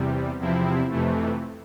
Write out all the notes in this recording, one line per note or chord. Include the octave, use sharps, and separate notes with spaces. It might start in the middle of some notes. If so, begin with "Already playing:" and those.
Already playing: E2 C3 G3
E2 C3 F3 C4 E4
F2 C3 E3 A3